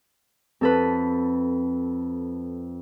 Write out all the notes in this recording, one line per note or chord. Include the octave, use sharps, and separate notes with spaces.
F2 A4 B4